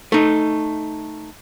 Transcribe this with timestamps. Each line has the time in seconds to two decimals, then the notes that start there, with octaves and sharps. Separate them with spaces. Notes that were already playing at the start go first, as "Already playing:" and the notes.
0.12 A3 D#4